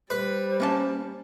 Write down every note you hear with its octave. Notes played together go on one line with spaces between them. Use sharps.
G3 B4 C5
A#3 C#4 A5